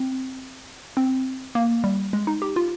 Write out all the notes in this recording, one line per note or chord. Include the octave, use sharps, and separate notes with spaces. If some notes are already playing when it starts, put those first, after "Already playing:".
Already playing: C4
C4
A#3
G3
G#3
D#4
G4
F4